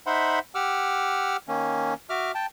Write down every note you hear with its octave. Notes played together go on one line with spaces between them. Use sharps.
D#4 C5 E5 F#5 B5 C6
G4 F#5 D6 E6 F6
D#3 A#3 C#4
F#4 E5 D6 F6
G5 A5